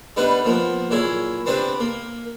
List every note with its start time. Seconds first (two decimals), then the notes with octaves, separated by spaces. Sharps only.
0.17 G3 B3 D4 D#4 B4
0.44 F3 A#3 B3
0.91 A#2 F#3 E4 G#4
1.46 B3 C4 D4 G4 B4
1.80 A#3